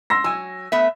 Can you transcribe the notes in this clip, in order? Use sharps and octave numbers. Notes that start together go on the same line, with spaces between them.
C6 E6 A#6
F#3 G#5 E6
A3 B3 E5